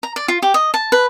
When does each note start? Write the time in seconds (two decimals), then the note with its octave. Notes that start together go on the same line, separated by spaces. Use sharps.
0.03 A#5
0.16 D5
0.28 F4
0.42 G4
0.54 D#5
0.74 A5
0.92 B4